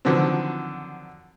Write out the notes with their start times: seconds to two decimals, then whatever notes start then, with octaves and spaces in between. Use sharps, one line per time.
0.05 D3 D#3 F3 F#3 B3 C4